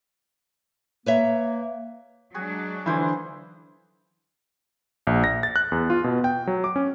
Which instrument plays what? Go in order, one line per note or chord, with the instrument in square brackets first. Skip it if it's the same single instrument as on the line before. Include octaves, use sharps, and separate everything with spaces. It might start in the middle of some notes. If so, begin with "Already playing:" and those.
[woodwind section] A#3 [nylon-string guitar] B4 C#5 E5
[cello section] F#3 G#3 D4 [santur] F#4 G#4
[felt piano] D3 E3 [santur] E4 C5 F5
[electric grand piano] A#1
A#6
A6
F#6
E2
F4
B2
G5
F#3
D6
C#4